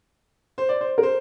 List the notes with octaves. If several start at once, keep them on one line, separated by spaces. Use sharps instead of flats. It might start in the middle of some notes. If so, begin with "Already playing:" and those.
C5
D5
C5
A#4
C5